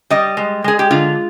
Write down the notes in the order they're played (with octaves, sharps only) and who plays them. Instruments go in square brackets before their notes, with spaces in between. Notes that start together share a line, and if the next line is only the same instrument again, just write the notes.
[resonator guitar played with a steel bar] G3 D#5
G#3
G#3 G#4
G4
D3 F4